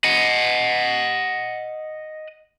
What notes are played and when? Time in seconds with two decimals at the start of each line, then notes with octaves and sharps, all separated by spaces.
0.04 D#5 F#5